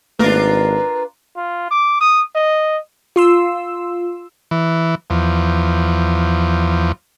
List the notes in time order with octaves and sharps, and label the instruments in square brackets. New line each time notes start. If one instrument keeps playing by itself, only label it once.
[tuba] G#1 [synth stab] A3 A#3 [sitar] D4 F4 A#4 [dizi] B4
[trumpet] F4
D6
D#6
D#5
[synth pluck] F4 C6 E6
[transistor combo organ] E3
E2 F3